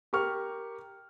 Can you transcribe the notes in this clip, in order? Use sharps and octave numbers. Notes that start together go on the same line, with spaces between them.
G4 A#4 C#6 F6